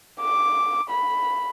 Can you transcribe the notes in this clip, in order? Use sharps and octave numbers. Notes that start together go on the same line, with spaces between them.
D6
B5